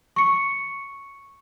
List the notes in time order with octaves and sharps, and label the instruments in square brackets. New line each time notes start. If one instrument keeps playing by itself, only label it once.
[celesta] C#6 C#7